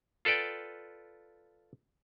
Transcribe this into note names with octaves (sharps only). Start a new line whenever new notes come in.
F4 A4 B4 D5 G5